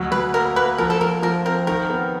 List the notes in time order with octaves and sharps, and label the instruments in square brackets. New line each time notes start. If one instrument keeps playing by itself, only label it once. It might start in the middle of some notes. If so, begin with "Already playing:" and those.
Already playing: [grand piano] D2 F#3
[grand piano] F#3 [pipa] B4
[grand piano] A#3 [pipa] A#4
[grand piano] A#3 [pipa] B4
[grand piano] F3 [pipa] A#4
[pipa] A4
[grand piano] F3 [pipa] A#4
[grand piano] F3 [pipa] A#4
[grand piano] C4 [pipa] A#4
[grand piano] D#3 [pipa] A#4
[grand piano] B3